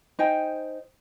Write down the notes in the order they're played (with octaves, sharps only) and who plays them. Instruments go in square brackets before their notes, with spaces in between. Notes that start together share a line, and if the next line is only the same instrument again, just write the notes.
[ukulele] D#4 C5 G5 G#5